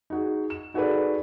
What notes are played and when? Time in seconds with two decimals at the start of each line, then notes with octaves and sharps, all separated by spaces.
0.10 D#4 F#4 G#4
0.50 E7
0.74 D#4 F#4 G#4 A4 B4 D5